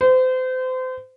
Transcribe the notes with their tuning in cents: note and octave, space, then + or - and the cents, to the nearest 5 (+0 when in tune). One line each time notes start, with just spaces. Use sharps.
C5 -30